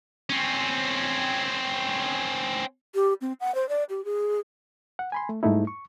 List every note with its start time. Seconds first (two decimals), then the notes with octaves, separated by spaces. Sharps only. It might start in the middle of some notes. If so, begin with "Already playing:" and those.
0.30 C4 C#4
2.94 G4
3.21 C4
3.40 F#5
3.55 C5
3.69 D5
3.90 G4
4.05 G#4
4.99 F#5
5.12 G#5 B5 C6
5.29 A3
5.43 G#2 G3 A3 D#4 E4
5.67 C#6